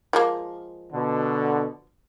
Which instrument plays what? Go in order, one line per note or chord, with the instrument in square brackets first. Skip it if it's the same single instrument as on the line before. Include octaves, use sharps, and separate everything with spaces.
[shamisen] F3 G#3 A#3
[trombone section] B2 D3